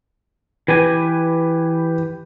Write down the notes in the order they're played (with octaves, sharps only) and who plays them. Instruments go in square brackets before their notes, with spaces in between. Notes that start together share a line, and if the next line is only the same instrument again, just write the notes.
[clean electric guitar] E3 G4 G#5 [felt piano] B4